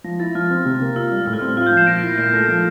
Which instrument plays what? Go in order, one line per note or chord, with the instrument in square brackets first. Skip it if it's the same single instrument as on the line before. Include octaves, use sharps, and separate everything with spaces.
[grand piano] F3 [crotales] A#6
[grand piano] E4 [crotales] A6
[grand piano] F3 [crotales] F6
[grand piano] C4
C3
A#3
[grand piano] F4 [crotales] E6
[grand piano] G3
[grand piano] A2 [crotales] E6
[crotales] F6
[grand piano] C4 [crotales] E6
[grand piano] F4 [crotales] F6
[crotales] G6
[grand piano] F3
[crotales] C7 E7
[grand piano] A#2 [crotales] A#6 D7
[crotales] A#6 D7
[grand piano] E4 [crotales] C7
[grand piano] A#2 [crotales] A#6 D7
[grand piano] A3
F3